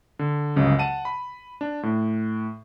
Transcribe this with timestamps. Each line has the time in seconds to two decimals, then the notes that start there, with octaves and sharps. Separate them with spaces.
0.19 D3
0.56 G1 C#2 C#3 F#3
0.79 F#5 A5 D#7
1.05 B5
1.61 D4
1.83 A2